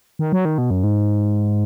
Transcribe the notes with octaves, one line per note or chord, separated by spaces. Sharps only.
D#3
F#3
D#3
B2
F#2
G#2